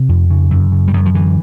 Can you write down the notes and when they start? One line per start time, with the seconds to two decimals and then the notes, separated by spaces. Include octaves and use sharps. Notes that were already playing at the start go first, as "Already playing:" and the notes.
Already playing: C3
0.09 F2
0.30 C#3
0.51 F#2
0.72 C#3
0.88 G3
0.94 F#2 F#3
1.06 F3
1.14 D3 E3